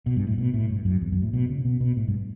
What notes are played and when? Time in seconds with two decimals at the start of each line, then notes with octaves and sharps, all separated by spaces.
0.06 B2
0.16 G2
0.27 A2
0.38 B2
0.54 A2
0.69 G2
0.85 F#2
1.01 E2
1.12 F#2
1.22 A2
1.33 B2
1.49 C#3
1.65 B2
1.81 B2
1.97 A2
2.08 G2